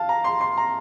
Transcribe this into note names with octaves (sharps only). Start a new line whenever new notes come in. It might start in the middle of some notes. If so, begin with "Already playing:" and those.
Already playing: F5 A5
A#5
C6
C6
A#5